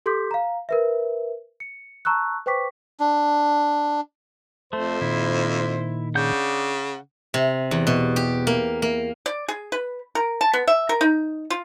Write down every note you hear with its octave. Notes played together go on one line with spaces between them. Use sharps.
G4 A4 C6 D6 G6 B6
F5 A#5
A#4 B4 E5
C#7
A5 A#5 C#6 E6 F#6
B4 C5 G5 C#6 D6 B6
D4
F2 A3 C5
A#2 D#3 E4
C#3 D4 F#5 G6
C3
E2
B2
G4
A#3
A#3
D5
G#4
B4
A#4
A5
B3
E5
A#4
D#4
F4